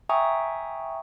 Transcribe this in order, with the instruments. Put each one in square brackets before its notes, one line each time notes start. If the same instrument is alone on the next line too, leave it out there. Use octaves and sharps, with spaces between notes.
[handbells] E5 G5 G#5 A#5 C#6 D#6